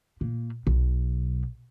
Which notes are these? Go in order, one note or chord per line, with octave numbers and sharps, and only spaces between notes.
A#2
B1